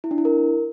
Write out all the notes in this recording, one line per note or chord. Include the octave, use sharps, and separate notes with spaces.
E4
D4
E4
A#4